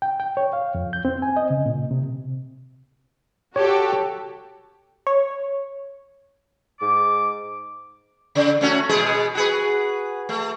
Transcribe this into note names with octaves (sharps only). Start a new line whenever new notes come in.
G5
G5
C#5
F5
F2
G6
C4
G#5
D#5
C#3
A#2
C3
F#4 G4 A4 C#5
C#5
G#2 D6
C#3
A3 C#4 F#4
B2 G#3 G#4
F#4 G#4 B4
A3